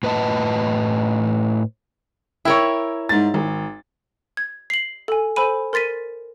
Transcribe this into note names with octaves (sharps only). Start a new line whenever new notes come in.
A2 B4 D#5 A5
E4 A#4 C#5 G5 E6
G#2 A6
G#1
G#6
C7 F#7
A4 G#5
A4 C5 G#5 B5 D#7
A#4 C6 A6 B6 D#7